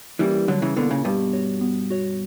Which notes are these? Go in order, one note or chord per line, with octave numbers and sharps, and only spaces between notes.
E3 G3 A#3 C#4 E4 A#4
D3 F#3 G3
C#3 E3
B2 D3 A#3 C#4 E4 A#4
A#2 C#3
G2 B2 B3
F#4 C#5
B3
F#4 C#5